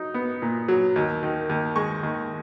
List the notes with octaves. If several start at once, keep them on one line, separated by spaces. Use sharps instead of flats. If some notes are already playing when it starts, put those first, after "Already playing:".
Already playing: F#3 D#4
B3
A#2
F#3
D#2
D#3
D#2
G#3 C#6
D#2